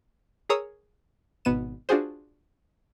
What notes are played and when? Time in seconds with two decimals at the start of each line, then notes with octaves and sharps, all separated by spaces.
0.49 G#4 A#4 C#5 A#5 D#6 E6
1.45 G#1 B2 B3 D#7 E7
1.89 D4 F4 F#4 G#4 C5